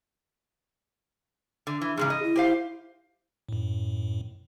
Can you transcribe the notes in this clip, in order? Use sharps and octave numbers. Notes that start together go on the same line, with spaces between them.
D3
E3
G#2 C#3 E3 G#4
D#5
E4
G4 C5 F5
F#2 A2